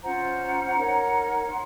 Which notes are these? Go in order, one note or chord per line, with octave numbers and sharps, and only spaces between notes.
C#4 F4 C5 F#5 A#5
D#4 A#4 C#5
C6